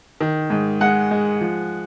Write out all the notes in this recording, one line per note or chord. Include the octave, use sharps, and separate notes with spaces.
D#3
G#2
G#3 F#5
G#3
F3